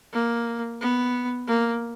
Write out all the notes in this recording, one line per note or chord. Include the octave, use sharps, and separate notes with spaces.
A#3
B3
A#3